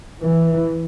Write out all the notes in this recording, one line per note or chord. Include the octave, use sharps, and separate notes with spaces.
E3